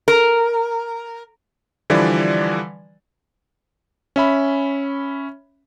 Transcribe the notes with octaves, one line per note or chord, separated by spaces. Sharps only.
A#4
D3 E3 F3 G3 B4 D5
C#4 E5 B5